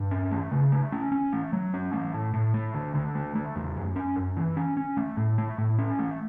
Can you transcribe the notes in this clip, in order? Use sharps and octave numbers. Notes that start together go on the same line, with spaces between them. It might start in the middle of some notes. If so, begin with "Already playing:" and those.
Already playing: G2
C#4
A3
C#3
A3
C#4
C#4
A3
F#3
C#4
A3
A2
A2
A3
D3
D3
A3
A3
E2
F#2
C#4
F#2
E3
C#4
C#4
A3
A2
A3
A2
C#4
A3